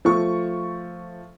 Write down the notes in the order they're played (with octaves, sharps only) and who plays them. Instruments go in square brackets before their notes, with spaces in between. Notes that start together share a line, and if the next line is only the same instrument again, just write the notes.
[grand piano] F3 A3 C#6